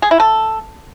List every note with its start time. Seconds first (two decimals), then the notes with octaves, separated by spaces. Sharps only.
0.02 G#4
0.11 E4
0.20 A4